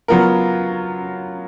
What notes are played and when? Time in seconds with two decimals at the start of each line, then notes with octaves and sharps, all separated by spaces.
0.08 F#3 B3 F4 A#4